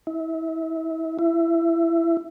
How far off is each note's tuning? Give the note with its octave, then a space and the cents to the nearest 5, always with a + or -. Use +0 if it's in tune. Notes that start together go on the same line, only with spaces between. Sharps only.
E4 -30
E4 +20